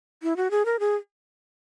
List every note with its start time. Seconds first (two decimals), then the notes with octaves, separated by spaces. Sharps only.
0.23 E4
0.37 F#4
0.51 G#4
0.65 A#4
0.80 G#4